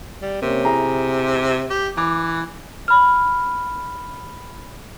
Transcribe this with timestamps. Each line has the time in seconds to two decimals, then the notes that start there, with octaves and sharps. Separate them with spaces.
0.22 G3
0.42 C3 A#3 C#4
0.65 E4 G#4 A#5
1.70 G4
1.97 E3 D6
2.88 B5 F6